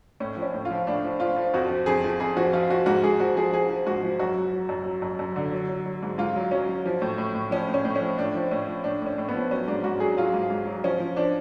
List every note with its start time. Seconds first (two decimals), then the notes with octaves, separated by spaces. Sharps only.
0.20 A2 C#4
0.37 F3
0.42 C#4
0.54 A2
0.65 F4
0.71 F3
0.87 A2 D4
1.04 F3
1.20 F3 F4
1.36 F3
1.54 F2 F#4
1.70 F3
1.86 F2 G#4
2.04 F3
2.20 F2 G#4
2.37 F3 F#4
2.53 F3 F4
2.70 F3 F#4
2.86 G#2 F#4
3.03 G#2 G#4
3.20 F3 F#4
3.36 F3 G#4
3.53 F3 G#4
3.69 F3
3.87 G#2 F#4
4.03 F3
4.19 F#2 F#4
4.36 F#3
4.53 F#3
4.69 F#2
4.85 F#3
5.02 F#2
5.19 F#2
5.36 D3
5.52 F#3
5.69 F#3
5.86 F#3
6.03 G#2
6.18 G#2 F4
6.35 F#3
6.51 F#3 C#4
6.68 F#3
6.86 F3
7.02 A2
7.18 A2
7.35 A2
7.51 F3 C#4
7.69 A2
7.74 C#4
7.85 A2
7.96 C#4
8.01 F3
8.18 A2 D4
8.35 F3
8.51 A2 C#4
8.68 F3
8.84 A2 D4
9.02 A2 C#4
9.18 A2
9.29 B3
9.34 F3
9.51 F#3 C#4
9.68 G#2 D4
9.84 G#2 F#4
10.00 F#3 G#4
10.17 F#3 F4
10.34 G#2
10.50 G#2
10.67 F#3
10.84 F3 C#4
11.00 F3
11.16 F3 D4